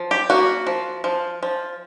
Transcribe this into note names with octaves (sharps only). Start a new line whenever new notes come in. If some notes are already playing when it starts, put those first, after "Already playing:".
Already playing: F3
G4
A#3 F#4
F3
F3
F3